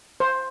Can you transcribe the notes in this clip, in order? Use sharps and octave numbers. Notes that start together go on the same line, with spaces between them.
C5